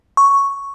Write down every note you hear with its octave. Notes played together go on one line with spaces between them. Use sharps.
C#6